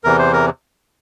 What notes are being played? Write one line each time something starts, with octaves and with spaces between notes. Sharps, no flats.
E2 C3 E3 A#4
C5
A#4